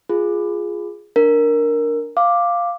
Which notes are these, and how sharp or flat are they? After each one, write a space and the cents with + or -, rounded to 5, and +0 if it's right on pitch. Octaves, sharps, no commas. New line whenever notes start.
F4 +0 G#4 +0
D4 +0 A#4 +0
F5 +0 D6 +0